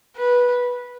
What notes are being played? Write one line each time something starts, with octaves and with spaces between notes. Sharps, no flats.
B4